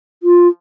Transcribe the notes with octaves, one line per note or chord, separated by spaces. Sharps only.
F4